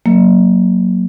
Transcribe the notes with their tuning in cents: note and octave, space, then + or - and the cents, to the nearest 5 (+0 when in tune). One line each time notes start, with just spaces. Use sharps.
F#3 +0 A#3 +0